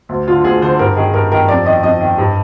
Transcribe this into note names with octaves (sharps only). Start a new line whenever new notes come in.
D2
D3 F4
D2 G#4
D3 C5
G2 A#4
D#3 G#4
G2 A#4
D#3 A#4
F2 D5
D#3 D#5
F2 D#5
D#3
G2